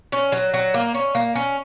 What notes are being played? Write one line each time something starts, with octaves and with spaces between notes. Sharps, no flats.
C#4
F#3
F#3
A#3
C#4
A#3
C#4